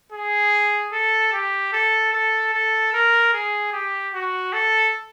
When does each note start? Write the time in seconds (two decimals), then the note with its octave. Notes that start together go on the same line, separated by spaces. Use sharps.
0.12 G#4
0.93 A4
1.33 G4
1.73 A4
2.14 A4
2.53 A4
2.93 A#4
3.33 G#4
3.73 G4
4.14 F#4
4.53 A4